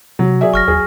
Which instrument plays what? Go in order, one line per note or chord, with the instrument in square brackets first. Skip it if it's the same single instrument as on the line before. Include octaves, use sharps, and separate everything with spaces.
[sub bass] C3 [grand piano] F#3
[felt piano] G#4 D5 E5
[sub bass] F#1 [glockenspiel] C#6 F6 A#6
[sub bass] D#2 [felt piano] G#4